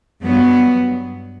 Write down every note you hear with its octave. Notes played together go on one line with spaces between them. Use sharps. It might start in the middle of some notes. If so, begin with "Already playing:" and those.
G2 F#3 B3